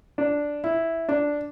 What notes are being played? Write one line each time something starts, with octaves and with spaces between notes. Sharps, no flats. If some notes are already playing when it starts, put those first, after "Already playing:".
D4
E4
D4